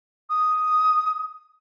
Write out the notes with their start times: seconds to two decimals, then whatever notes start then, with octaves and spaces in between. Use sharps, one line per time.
0.30 D#6